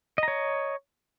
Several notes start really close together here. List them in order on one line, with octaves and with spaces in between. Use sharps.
D#5 A#5 C#5